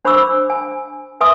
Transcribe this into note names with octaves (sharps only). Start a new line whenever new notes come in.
D4 C5 B5 C#6 D6 E6
G#5
B4 E5 G#5 C6 D#6